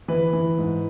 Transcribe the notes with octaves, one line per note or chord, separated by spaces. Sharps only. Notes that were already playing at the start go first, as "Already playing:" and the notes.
E3 B4
E3
G#2